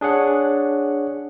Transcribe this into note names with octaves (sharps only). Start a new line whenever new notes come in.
D4 G#4 C#5 F#5